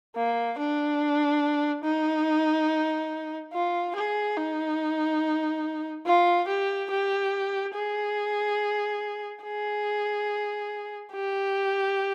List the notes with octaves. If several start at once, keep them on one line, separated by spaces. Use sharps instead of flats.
A#3
D4
D#4
F4
G#4
D#4
F4
G4
G4
G#4
G#4
G4